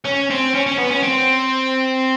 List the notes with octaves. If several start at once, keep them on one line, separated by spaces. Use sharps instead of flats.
C#4
C4
C#4
C#4
B3
C#4
C4